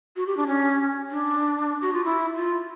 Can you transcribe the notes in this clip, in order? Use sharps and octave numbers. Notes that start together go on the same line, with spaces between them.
F#4
G4
D4
C#4
D4
F#4
F4
E4
F4